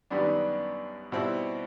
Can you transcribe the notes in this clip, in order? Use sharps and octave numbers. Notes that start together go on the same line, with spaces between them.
F#2 D#3 G3 B3 D4
B2 G3 C4 E4